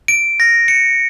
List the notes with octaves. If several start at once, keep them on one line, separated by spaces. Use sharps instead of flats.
D7
A#6
C#7